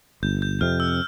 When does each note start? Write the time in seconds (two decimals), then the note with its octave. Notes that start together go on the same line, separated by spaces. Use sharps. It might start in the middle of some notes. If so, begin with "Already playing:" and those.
0.23 G1 G6
0.42 G6
0.61 F2 C3 F6
0.80 E6